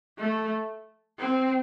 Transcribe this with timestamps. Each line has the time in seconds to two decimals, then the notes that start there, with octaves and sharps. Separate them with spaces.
0.18 A3
1.19 C4